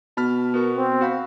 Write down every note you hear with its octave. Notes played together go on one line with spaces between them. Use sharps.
B2 A5 B5 F6
B3 F#4 A#4 C#6
C4
F#4 F5 B5